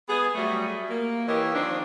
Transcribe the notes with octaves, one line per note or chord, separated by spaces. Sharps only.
B3 G#4
F#3 G3 A3
A#3
E3 A#3 G4 C#5 D#5
D#3 F3 C4 D4